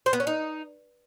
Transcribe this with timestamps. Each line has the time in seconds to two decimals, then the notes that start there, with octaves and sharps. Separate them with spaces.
0.06 C5
0.13 B3
0.20 C#4
0.27 D#4